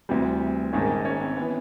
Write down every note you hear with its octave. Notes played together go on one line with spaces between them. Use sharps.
D2 C3 E3 G3 C4
A#1 G#2 D#3 C#4
C#4
C4
E3 B3